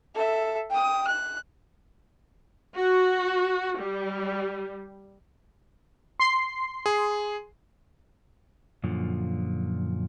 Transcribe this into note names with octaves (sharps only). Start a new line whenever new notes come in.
A4 E5
G5 D#6
F#6
F#4
G3
C6 C7
G#4
F#2 A#2 D3 F3